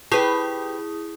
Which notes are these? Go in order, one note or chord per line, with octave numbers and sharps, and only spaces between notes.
E4 G4 G#4 B4 D#6